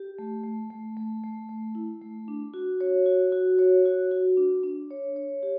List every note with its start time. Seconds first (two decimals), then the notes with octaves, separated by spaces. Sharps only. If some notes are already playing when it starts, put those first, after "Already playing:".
Already playing: G4
0.19 A3
0.44 A3
0.71 A3
0.97 A3
1.24 A3
1.49 A3
1.75 E4
2.02 A3
2.28 D4
2.54 F#4
2.81 C#5
3.06 F#4
3.32 F#4
3.59 C#5
3.85 F#4
4.11 F#4
4.37 D4
4.63 D4
4.90 C#5
5.16 C#5
5.43 G4